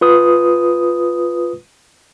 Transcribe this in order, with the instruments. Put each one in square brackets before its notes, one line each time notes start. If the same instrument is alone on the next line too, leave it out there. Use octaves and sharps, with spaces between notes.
[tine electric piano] F4 B4 D#6